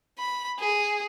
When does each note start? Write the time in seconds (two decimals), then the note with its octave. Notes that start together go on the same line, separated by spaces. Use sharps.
0.18 B5
0.59 G#4